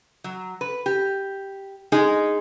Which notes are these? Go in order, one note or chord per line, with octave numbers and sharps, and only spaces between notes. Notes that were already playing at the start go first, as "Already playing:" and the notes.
F#3
B4
G4
G#3 D#4 G#4